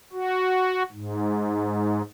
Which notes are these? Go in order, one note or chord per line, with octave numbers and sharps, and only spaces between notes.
F#4
G#2